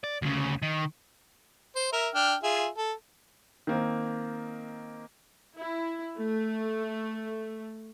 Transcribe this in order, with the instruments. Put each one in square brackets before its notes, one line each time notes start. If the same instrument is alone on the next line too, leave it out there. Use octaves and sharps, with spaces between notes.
[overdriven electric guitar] D5
D2 C#3
D#3
[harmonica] C5
A#4 E5
D4 G5 F6
F4 G#4 E5
A4
[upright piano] D#3 A#3 C4
[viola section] E4
A3